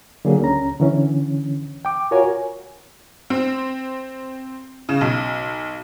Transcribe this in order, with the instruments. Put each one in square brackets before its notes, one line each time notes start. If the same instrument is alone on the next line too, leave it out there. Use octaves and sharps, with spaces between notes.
[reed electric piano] D3 F#3 A#3 G#4
C#2 C#4 A#5
D3 E3 C#4
G5 D6
F4 F#4 A#4 C#5 G#5
[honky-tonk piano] C4
C#3
B1